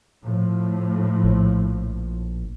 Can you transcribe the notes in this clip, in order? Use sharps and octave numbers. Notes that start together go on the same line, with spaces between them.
A2 F3
A#1